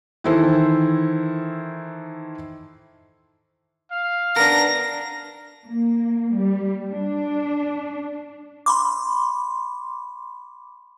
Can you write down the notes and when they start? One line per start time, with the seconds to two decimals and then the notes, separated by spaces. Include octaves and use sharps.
0.24 D#3 E3 E4 A4 C5
3.91 F5
4.36 B3 D4 A#4 A#6
5.68 A#3
6.36 G3
6.91 D4
8.66 B5 C6 D6